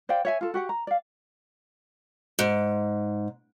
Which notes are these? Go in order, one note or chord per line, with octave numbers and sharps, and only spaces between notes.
C5 D5 F5 G5
C#5 E5 G#5
F4 A4
F#4 G4 F#5
A#5
D5 F5
G#2